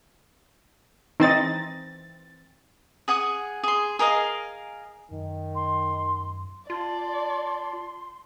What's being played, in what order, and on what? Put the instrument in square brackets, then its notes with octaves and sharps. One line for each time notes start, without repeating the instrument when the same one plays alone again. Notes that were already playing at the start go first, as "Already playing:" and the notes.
[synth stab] E3 C4 A6 [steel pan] D#4 D#5
[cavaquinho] G#4 F#5 G#5 D#6
G#4 C6
G#4 A#4 D#5 F5
[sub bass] F#2 [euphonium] D#3
[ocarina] C6
[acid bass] F4 [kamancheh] D5 [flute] A5 [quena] C6